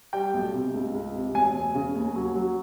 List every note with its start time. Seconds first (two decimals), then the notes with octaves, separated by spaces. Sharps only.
0.13 G3 G5
0.34 B1
0.54 C3
0.74 C#2
0.94 C#2
1.14 C3
1.34 E1 G#5
1.55 E1
1.75 C#3
1.95 D#2
2.15 F#3
2.35 F#3